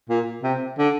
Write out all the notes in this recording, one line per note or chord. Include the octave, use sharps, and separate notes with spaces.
A#2
C3
D3